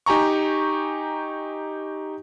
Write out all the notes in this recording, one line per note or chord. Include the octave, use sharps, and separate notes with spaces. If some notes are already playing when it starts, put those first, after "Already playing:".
D#4 G4 G#5 A#5 C#6